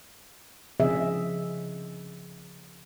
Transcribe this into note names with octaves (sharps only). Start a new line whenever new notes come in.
C#3 F3 C4 G#4 D#5 E5